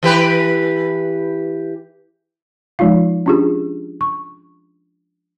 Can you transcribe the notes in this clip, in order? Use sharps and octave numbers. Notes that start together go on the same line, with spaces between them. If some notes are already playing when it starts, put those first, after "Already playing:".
E3 G4 B4
F3 G#3 D#4 F4 F5
C#4 D4 F4 G4 G#4
C#6